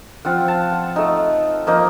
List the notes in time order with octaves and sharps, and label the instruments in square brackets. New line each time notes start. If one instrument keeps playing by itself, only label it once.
[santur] F3 C4 F4 F#5
A5
F#5
A3 D#4
F3 A#3 D#4